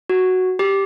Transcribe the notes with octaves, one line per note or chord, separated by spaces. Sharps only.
F#4
G4